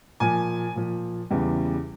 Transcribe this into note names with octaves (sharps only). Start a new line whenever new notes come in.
A#2 F3 G#5
A#2 F3
E2 C#3 E3 G3